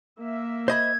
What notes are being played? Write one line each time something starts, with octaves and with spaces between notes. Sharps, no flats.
A#3 E5
C5 D#5 B5 G#6